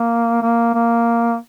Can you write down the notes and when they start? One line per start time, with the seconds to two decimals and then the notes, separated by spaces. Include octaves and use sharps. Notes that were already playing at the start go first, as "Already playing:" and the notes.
Already playing: A#3
0.42 A#3
0.74 A#3